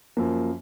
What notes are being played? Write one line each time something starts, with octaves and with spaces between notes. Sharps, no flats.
F#2 F3 A#3